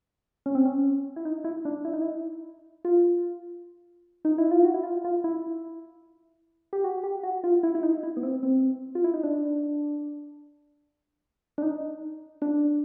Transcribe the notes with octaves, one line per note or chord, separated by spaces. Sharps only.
C#4
C4
C#4
E4
D#4
E4
D4
E4
D#4
E4
F4
D#4
E4
F4
F#4
E4
F4
F4
E4
G4
F#4
G4
F#4
F4
E4
E4
D#4
E4
B3
C4
C4
F4
E4
D#4
D4
D4
D#4
D4